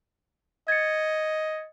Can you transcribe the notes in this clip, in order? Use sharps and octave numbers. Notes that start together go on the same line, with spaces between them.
D#5 G#6 A6 C#7